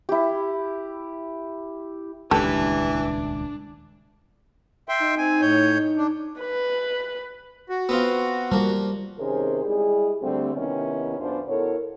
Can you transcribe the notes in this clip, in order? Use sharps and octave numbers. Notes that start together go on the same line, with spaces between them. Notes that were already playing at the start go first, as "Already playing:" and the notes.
E4 G4
D#1 C#2 E3 D4 G4 A4
E5 G5 C6
D#4
C4 G#5
A2 C#5 G6
D4
B4
F#4
B3 C4 F4
F3 G3 A#3
C3 D#3 C#4 G#4 A#4 C5
G3 G#3 E4 G#4
D2 D3 G3 A3 C4
C3 D#3 B3 C#4 D#4 E4
F#2 B3 D4 F4 C5
B2 E4 A4 A#4 C#5